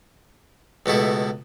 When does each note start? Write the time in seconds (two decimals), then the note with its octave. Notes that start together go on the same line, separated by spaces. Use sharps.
0.86 C#2 B2 A3 E4